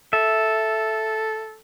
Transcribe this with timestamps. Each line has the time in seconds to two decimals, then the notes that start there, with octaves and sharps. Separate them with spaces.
0.13 A4 E5